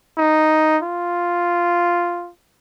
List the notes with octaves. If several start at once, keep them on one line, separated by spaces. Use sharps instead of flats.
D#4
F4